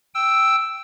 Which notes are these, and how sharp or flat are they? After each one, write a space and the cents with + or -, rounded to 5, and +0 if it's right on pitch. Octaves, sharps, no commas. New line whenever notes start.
G5 +0 E6 +0